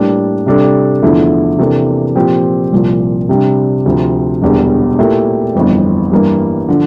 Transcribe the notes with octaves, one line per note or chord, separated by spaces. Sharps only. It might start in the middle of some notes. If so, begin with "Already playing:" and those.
Already playing: A2 G3 A#3 D4
C3 G3 D4 A4
E2 D3 F3 A3 E4
C3 E3 A#3 D4 A4
A#2 F3 C4 G4
C2 A#2 F3
C3 G3 D4
D2 C3 F3
E1 E2 D3 G3
A#2 A3 E4 G4 A#4
G1 F2 E3
G2 E3 A#3
D3 F3